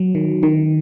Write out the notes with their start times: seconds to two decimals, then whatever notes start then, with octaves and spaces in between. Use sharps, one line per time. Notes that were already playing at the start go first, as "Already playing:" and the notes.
Already playing: F#3
0.15 D#3
0.43 D#3